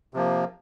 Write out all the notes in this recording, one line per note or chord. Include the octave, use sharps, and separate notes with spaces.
C3 F3 A#3